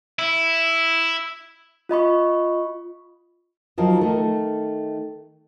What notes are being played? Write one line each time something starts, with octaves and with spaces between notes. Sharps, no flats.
E4
F4 D#5 B5 C#6
D#3 F3 F#3
D#3 A3